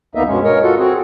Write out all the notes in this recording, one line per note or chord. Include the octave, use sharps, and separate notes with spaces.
D2 A#3 B3 D#4 D#5 E5
G2 B2 G#3 C#4
A#4 C#5 D#5
F4 F#4 A4
C4 F#4 G#4